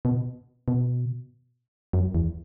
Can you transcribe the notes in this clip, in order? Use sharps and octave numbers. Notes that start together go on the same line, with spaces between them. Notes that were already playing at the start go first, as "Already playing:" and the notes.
B2
B2
F#2
E2